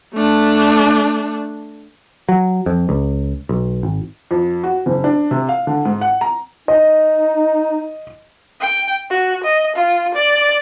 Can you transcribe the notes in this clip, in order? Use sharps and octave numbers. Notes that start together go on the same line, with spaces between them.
A3 D4
F#3
F2
C#2
B1
G#1
F2
F#4
F#1
D4
C3
F5
D3
G#2
F#5
A#5
D#4 D#5
G5
F#4
D#5
F4
D5